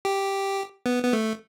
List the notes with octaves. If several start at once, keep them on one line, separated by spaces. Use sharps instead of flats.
G4
B3
B3
A3